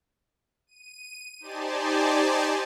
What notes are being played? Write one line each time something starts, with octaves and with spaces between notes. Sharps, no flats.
D#7
D#4 G4 C5 D5 G#5 A5